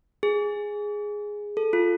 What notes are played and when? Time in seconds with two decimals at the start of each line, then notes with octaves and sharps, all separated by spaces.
0.23 G#4
1.57 A4
1.73 F4